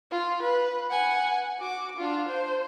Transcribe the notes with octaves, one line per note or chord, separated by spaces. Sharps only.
F4
B4
F#5 G#5
F#4 D6
D4 F4
C5